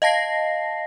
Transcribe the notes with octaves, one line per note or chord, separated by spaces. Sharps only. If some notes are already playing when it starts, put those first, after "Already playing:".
D#5 F5 A5 A#6 C7